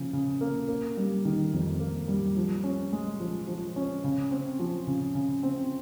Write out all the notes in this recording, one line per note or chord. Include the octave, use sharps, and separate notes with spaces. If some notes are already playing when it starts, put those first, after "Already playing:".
Already playing: C#3 F3 A#3
C#3
A#3
A#3
G3
D#3
F2
A#3
G3
F3
C#4
G#3
F3
F3
C#4
C#3
C4
F3
C#3
C#3
C4